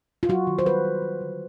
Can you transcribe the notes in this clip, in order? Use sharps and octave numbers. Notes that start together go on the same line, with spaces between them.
F4
F#3 F#4
D#3
C5
G3 B4
G3
G3
D3